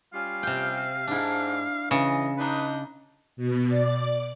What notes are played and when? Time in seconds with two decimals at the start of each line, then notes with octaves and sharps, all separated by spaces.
0.14 G3 C#4 F4 F5
0.43 C3 G5
1.07 G#2 D4 E4
1.91 C#3 E3 D#5
2.38 D4 D#4 B4
3.37 B2
3.67 D5